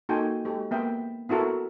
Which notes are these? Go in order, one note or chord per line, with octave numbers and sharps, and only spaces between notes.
A#3 D#4 F#4 A4 G5 G#5
G#3 G4 A4
A#3 B3 E5 G5
B3 E4 F#4 A4 A#4